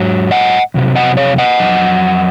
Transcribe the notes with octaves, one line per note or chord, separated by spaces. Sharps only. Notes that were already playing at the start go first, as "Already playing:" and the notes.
Already playing: G#2 F#3
D#5 F#5
F2 C3 F#3
D#5 F#5
C#5 F5
D#5 F#5
F2 C3 F#3